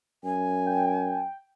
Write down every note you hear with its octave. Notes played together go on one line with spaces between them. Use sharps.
F#2 G#5
G5